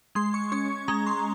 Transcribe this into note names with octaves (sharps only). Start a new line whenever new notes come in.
G#3 C6
C#6
C#4 C#6
G#3 A#5
C6